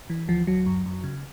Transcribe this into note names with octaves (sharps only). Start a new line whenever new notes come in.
E3
D2 F3
D2 F#3
F#2
F#2
C#3